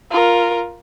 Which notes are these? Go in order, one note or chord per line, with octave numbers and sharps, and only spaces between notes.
F4 A#4